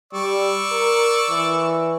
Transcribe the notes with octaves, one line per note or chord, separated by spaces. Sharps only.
G3 D5 C#6 E6
A#4
E3